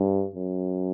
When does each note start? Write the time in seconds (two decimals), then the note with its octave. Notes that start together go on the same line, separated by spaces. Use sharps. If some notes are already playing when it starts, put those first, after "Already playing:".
Already playing: G2
0.35 F#2